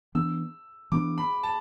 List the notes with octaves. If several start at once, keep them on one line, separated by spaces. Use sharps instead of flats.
E3 B3 D4 E6
E3 B3 D4 D6
B5
A5